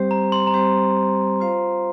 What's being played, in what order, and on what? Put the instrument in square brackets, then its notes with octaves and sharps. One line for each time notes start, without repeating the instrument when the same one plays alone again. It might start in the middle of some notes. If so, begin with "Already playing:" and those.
Already playing: [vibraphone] G3 C4 G4 C5
[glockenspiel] A#5
C6
A#5
[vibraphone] G3 C4 G4 C5 [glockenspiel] C6
[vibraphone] F4 C5 F5